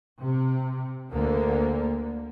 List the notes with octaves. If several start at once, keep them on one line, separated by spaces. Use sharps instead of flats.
C3
D2 D3 A#3